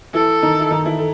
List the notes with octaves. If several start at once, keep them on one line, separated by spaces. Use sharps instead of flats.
E3 E4 A4
D#3 D#4
E4
D#3 D#4
E3 E4
A4